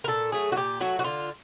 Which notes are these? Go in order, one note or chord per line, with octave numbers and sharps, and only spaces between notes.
A#4
A#2 A4
F#3 A3 G#4
F#4
A#2 G4
F#3 A3 F#4
F#4
D3 F4